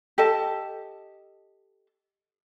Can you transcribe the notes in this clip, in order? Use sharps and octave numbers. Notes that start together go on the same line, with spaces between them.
G4 A4 D#5 A5